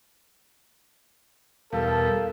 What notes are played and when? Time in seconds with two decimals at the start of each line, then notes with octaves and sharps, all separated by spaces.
1.73 E2 B2 G3 A4 A#4 F5